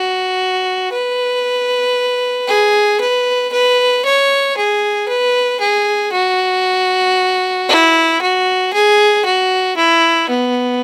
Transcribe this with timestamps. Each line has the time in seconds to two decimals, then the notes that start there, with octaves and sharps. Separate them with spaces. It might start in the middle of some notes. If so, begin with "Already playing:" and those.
Already playing: F#4
0.92 B4
2.48 G#4
3.00 B4
3.53 B4
4.05 C#5
4.57 G#4
5.08 B4
5.60 G#4
6.12 F#4
7.69 E4
8.22 F#4
8.74 G#4
9.25 F#4
9.77 E4
10.29 B3